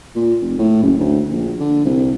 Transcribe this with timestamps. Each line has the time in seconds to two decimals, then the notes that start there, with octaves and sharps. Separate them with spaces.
0.15 A#2
0.41 F1
0.58 A2
0.83 F#1
0.99 D2
1.31 A#1
1.60 D3
1.85 C2